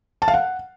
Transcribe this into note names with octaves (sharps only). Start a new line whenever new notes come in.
A5
F5
F#5